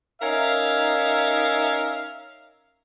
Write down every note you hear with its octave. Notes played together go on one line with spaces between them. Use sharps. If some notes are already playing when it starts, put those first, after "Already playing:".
C#4 D#4 A#4 E5 F5